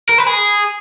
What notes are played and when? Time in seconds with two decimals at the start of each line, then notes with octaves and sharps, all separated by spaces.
0.09 A#4
0.18 B4
0.27 G#4